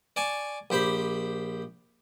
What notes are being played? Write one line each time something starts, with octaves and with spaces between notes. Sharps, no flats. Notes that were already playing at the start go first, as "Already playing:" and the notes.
D5 G#5 A5 C#6
A#1 G4 C5 B5